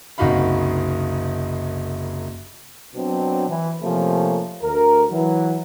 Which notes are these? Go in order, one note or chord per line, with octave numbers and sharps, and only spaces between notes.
F#1 C2 D#4 F#4 F5 B5
B2 F#3 C4 D4
E3
C3 F3 A3 A#3 C#4
D2 A#4
E3 F#3